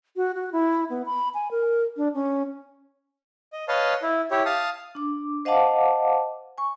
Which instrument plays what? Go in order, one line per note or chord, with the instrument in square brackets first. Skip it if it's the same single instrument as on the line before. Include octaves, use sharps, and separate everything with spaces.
[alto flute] F#4
F#4
E4
B3
B5
G#5
A#4
D4
C#4
[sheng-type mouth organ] D#5
B4 C#5 D#5 F5 A5
E4
E4 G4 C#5
F5 A5 D#6
[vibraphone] D4 D6
C5 D#5 F5 F#5 A5 D6
G#5 C#6